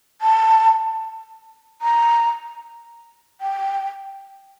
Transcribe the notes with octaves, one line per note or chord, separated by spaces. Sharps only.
A5
A#5
G5